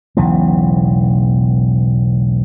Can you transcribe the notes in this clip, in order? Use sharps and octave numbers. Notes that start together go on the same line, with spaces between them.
E1 B1 C#3 E3